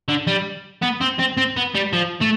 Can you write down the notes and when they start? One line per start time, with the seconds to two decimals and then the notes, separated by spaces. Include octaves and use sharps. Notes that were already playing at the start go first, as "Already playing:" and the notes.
0.09 D3
0.27 G3
0.82 B3
1.01 C4
1.19 C4
1.37 C4
1.56 B3
1.75 G3
1.93 F3
2.21 A3